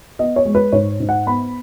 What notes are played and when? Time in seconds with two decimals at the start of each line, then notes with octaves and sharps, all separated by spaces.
0.19 B3 D#5
0.36 C#5
0.45 G#3
0.55 B4
0.72 G#2 C#5
1.00 G#2
1.09 F#5
1.27 B3 B5